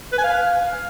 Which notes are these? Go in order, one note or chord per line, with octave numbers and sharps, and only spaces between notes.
B4
G#5
F5